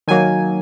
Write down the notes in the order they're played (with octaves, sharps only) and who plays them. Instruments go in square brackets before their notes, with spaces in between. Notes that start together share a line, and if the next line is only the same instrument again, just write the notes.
[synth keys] D#3 F#3 A#3 G#5